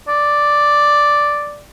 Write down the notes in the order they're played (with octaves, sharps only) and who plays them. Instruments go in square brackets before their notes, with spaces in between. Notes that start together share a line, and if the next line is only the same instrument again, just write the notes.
[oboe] D5